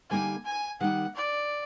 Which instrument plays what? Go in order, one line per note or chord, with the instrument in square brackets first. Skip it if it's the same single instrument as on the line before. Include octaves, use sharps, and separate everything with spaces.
[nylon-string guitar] D3 G3 A#3 D#4 G4 [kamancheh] G#5
[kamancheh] G#5
[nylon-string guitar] D#3 G3 A#3 D#4 [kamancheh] F#5
[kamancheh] D5